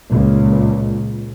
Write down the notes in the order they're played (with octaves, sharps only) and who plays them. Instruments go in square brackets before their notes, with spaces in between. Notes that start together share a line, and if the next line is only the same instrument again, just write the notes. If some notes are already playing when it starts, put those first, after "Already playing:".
[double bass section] C#2 A#2